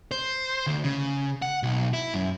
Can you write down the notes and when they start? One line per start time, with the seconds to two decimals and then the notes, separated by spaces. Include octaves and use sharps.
0.11 C5
0.67 D2
0.84 C#3
1.42 F#5
1.63 B1
1.93 E4
2.14 F#2